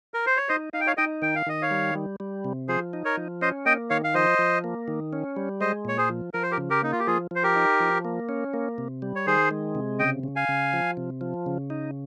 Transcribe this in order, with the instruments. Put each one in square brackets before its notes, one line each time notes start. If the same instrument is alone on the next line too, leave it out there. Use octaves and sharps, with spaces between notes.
[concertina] A#4
C5
C#5
[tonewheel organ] D#4 [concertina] C5 D#5
[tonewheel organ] D#4 [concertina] F5
[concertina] G5
C#5 F5
[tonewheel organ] D#4 [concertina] D#5 G5
[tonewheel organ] D#3 [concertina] G5
[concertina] F5
[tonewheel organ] D#3 [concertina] D#5
[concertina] C#5 F5
[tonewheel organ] G3
G3
G3
C3
[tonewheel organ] F3 [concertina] G#4 C5
[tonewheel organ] D#4
[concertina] A#4 C#5
[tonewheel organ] F3
[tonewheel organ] C#4 [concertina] C5 D#5
[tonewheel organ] A#3 [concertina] D#5 G5
[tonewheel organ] D#3 [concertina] C#5 F5
[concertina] F5
[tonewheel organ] F3 [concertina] C5 D#5
[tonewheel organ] F3
A#3
D#3
C#4
G3
[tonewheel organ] G#3 [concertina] C5 D#5
[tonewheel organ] A#2 [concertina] C#5
[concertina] G#4 C5
[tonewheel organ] F3
[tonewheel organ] F3 [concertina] A#4
[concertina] C5
G4 A#4
[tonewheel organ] C#3
[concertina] G4 A#4
[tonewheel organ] A#3 [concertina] D#4
[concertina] F4
G4
[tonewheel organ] F3 [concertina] F4 G#4
[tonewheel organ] F3 [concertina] C5
[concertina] G4 A#4
[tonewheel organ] D#4
F3
A#3
C#4
A#3
C3
G3
[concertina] C#5
[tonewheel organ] D#3 [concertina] G#4 C5
[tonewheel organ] G#3
C3
[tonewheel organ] C#3 [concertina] D#5 G5
[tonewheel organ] C#3
[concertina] F5 G#5
[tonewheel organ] C#3
F3
C3
F3
C#3
D#4